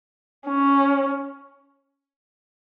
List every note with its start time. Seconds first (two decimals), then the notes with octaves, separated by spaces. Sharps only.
0.47 C#4